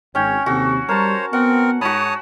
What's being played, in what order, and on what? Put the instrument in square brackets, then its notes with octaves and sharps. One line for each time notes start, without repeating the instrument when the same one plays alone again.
[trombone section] G#1 [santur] C#4 G5 [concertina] C#5
[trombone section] D#2 C3 [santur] F#4 [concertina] A4
[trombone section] G3 [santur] A#4 A5 [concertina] C5 C#5
[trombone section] B3 [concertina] C4 A#4 [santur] F#5
[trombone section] G#2 [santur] F#4 B5 [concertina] C#5 A5 D#6